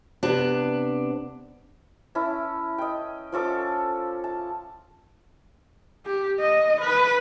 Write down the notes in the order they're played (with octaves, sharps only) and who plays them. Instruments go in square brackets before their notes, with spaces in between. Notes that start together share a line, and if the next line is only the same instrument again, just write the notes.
[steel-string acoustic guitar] C3 B3 D4
[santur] C#4 E4 A5
D#5 G5
F3 C#4 A4 D6
A5
[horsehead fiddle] G4
D#5
B4